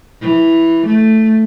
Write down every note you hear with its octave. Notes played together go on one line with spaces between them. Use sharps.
E3
A3